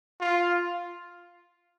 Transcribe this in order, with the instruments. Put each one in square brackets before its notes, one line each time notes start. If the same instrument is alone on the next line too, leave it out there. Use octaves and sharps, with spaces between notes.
[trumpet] F4